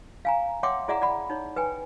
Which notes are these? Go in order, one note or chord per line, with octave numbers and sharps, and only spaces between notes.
F5 G#5 A#5
C#5 E5 F#5 G5 C6 D6
E4 G#4 D5 E5 F#5 A#5
D5 F#5 B5
D#4 C#5
B4 G5 G#5